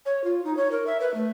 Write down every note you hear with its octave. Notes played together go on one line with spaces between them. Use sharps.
C#5
F4
D#4
C#5
A#4
E5
B4
A3